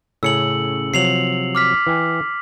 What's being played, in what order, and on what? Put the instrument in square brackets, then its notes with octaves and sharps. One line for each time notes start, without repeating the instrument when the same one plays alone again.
[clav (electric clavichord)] A2 C#3 C#4 [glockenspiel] E6 C#7 F#7
[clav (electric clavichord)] C3 F3 F#3 [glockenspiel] C7 F7 F#7
[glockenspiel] D6 F6 B6
[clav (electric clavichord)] E3 G5 G#5